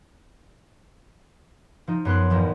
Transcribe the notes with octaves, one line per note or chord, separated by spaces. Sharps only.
F3 D#4
F#2 B3 C6 F#6
A1 D#2 F3